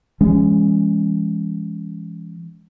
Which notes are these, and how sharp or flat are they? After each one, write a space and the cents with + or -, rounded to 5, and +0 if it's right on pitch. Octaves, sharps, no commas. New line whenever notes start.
E3 +30 G#3 -20 C#4 +0